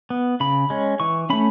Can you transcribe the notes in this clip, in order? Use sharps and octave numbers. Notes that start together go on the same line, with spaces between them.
B3
C#3 B5
G#3 C#4
E3 C#6
A3 C#4 B5